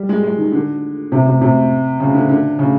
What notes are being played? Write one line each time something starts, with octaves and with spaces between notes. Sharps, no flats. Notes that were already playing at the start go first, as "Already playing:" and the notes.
Already playing: G3
G#3
G#3
D#3
D3
C3
C3
C3
C#3
D3
D3
C#3